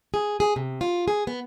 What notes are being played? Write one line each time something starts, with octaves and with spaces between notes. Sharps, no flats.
G#4
G#4
C3
F4
G#4
B3